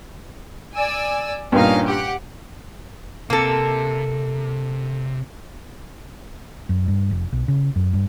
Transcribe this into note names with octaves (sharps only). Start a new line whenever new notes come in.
D5 G#5 E6
G2 A#2 C#4 D#4 F5
G4 F#5
C3 A#3 A4
F#2
G2
F1
B1
C#3
F#2
G2